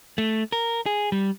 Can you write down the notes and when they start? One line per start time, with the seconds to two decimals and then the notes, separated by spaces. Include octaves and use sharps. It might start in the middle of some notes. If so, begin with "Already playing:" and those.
0.18 A3
0.52 A#4
0.86 G#4
1.12 G3